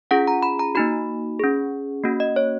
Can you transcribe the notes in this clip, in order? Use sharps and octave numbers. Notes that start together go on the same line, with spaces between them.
C#4 F4 G#4 F#5
A#5
B5
A#5
A#3 D#4 F#4 B5
C#4 G#4
A#3 C#4 F#4
D#5
C#5